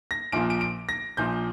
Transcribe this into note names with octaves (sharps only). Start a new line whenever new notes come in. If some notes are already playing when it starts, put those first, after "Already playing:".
A#6
A#1 A#2 F3 D7
D7
D7
A#6
A#1 A#2 F3 G6